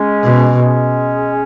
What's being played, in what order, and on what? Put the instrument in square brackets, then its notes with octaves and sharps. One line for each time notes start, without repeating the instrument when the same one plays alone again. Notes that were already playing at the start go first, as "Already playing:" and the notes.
Already playing: [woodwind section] G#3 C#4
[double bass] B2
[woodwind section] G#3 C#4